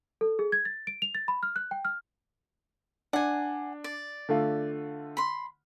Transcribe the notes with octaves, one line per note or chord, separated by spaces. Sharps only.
A4
G#4
G#6
A6
D7
F7
A6
B5
F6
F#6
G5
F6
D4 F#5 G#5
D5
D3 A3 F4
B5 C6